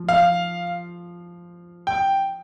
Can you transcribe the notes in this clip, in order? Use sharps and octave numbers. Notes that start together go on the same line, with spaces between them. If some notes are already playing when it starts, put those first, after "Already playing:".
Already playing: F3
F5
G5